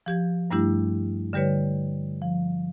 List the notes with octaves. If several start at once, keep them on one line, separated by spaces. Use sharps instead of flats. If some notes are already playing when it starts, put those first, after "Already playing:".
F3 G4 G#6
G2 G3 A3 D4 E4 G4
D3 G3 G4 B4 C#5
F3